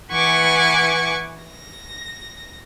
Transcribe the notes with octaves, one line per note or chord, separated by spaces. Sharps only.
E3 B4 F#5 G#5 C#6 D6
A#6